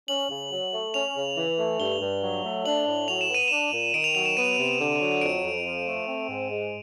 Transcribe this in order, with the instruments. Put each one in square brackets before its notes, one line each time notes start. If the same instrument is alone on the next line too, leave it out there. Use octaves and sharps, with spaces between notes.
[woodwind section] C#4 [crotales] F#7
[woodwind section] C#3
F#3
A3
[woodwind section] C#4 [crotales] F7
[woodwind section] C#3
E3
A3
[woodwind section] G2 [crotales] G7
[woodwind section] G2
F#3
A3
[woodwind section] D4 [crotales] F#7
[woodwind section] A2
[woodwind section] F#3 [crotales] F7
[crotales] E7
[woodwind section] B3
[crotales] D#7
[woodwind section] D4 [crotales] E7
[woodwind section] A#2
[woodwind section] D#3 [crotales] D7
[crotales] F7
[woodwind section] F#3 [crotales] F7
[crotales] E7
[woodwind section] B3 [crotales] D#7
[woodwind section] C3
D3
F#3
[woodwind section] F2 [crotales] D7
[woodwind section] F2
F3
A3
C4
G#2
G#3